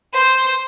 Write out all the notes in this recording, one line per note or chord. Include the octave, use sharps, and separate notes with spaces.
C5